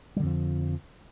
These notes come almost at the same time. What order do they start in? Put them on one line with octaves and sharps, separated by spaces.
G3 D3 F2 F3